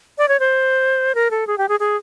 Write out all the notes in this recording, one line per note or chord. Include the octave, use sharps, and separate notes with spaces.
D5
C#5
C5
A#4
A4
G#4
G4
G#4
G#4